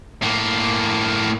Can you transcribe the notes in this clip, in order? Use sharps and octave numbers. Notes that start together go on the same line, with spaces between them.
A2 A#3